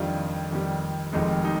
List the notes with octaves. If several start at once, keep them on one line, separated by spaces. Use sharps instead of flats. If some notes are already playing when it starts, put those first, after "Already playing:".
Already playing: F2 D#3 G3 D4 F4
F2 D#3 G3
F1 F2 D#3 G#3 D#4 G4
D#4 G4